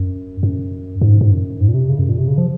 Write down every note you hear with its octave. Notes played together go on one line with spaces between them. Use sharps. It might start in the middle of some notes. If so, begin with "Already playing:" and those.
Already playing: F#2
F#2
G#2
G#2
F#2
G#2
A#2
C3
C#3
F#2
A#2
C3
C#3
F3